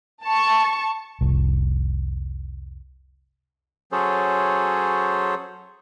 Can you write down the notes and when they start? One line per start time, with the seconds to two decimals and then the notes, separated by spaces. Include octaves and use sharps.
0.24 A5 C#6
1.21 F1 C2
3.92 F#3 C#4 G#4 A4 C5 C#5